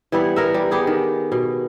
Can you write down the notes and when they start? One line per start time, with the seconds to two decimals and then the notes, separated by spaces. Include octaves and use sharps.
0.12 E3 G3 B3 E4
0.36 B3 A#4 E5
0.54 G3
0.71 B3 G4 G#4
0.87 D#3
1.32 B2